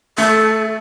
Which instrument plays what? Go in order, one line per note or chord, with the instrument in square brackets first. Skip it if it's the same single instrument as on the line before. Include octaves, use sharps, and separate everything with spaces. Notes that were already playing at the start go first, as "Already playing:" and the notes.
[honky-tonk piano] A3 [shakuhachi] A4